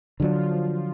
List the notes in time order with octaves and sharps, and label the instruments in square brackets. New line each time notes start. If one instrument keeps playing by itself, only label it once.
[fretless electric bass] D3 F#3 D4 [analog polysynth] F3 F4